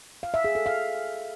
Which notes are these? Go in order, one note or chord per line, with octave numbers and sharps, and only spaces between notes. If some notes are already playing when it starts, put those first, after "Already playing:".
F5
E5
G#4
A4
F5